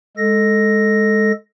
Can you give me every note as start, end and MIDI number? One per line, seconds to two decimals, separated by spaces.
0.17 1.32 56
0.17 1.32 69
0.17 1.32 94